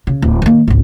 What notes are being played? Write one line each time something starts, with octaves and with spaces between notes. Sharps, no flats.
C#3
D1
D#3 A#3
G#1 C#2